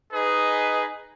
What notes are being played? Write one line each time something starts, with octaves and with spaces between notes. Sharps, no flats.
D#4 G#4 B4 D#5